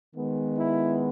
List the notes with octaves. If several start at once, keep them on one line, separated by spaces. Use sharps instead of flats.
D#3 G#3 B3
E4